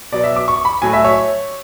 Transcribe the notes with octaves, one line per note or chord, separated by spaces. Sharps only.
B2 F#3 B3 D5
E5
D6
C#6
B5
A2 F#3 A3 G#5
E5
C#5